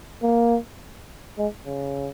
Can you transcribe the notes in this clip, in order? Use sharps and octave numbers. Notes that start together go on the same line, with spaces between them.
A#3
G#3
C#3